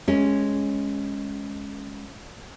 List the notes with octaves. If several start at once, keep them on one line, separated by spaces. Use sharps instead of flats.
G#3 C#4